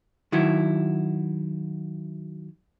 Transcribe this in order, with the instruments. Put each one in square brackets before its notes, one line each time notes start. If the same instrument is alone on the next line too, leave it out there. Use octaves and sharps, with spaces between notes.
[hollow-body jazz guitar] D#3 F#3 E4